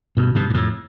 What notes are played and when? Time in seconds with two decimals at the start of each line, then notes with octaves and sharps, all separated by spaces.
0.17 G2 B2
0.35 G2 B2
0.50 G2
0.54 F2 A2